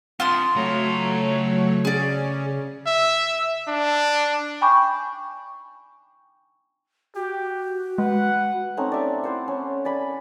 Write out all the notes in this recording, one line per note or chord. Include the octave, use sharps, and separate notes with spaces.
C4 D4 F4 C6 D#6
C#3 F#3 A3 C#5 A#5
C#4 G#4 D5
E5
D4
G5 G#5 B5 C#6 D6 G6
F#4 G4
G#3 B4 F#5
A3 C4 C#4 D#4
D5 E5 A5
E4 C5 F#5
C#4
D5 G#5 B5